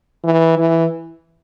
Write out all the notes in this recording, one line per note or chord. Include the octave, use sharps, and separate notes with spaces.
E3
E3